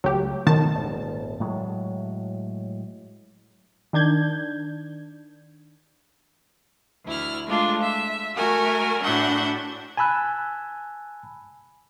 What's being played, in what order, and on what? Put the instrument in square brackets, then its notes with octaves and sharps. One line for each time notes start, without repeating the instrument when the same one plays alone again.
[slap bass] C#2 A3 [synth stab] F#3 G4
[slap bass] B2 F3 A3 [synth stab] D#3 A5
[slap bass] D#1 G#1
A2 F#3 G#3
[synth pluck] D#3 D4 G6 G#6
[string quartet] D2 E4 F6
G#3 A3 D4 F4
E5
A3 F#4 A#4 G#5
A2 D4 F#4 E5 F#5 G6
[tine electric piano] G#5 A5 B5 E6 F#6